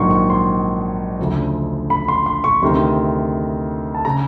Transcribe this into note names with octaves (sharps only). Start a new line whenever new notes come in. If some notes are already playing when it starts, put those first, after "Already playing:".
Already playing: A#1 G#2 D#3 F#3 C6 C#6
C#6
C6
D2 C#3 F3
B5
C6
C6
C#6
D2 C3 D#3 C6
A5
C#3 A#5